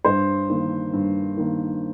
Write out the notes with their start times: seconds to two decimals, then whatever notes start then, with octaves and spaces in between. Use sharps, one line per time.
0.05 G2 C5
0.49 D#3 A#3
0.93 G2
1.37 D#3 A#3